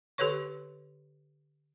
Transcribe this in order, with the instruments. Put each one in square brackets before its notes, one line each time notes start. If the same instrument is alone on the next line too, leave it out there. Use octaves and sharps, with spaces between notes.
[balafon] D3 G4 A4 B4 C#5 C#6